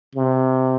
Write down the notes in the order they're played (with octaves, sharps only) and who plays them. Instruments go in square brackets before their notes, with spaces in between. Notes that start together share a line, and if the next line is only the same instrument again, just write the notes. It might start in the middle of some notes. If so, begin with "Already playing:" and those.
[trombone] C3